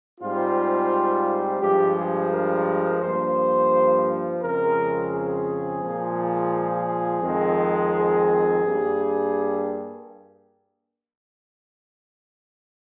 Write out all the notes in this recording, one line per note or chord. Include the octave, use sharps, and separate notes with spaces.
G#2 G3 C4 F4
G2 F3 G#3 G4
G#4
A#4
G2 F3 A#3 C5
F2 C#3 G#3 C4 A#4
G#4
A#2 F3 G#3
F2 D#3 G#3 C4
G#4
G2 G3 A#3